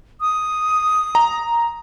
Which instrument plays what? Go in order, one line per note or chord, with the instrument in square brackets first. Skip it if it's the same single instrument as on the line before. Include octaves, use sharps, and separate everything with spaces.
[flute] D#6
[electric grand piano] A#5